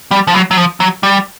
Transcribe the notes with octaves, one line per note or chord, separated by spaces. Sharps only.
G3
F3
F#3
F#3
F3
F#3
G3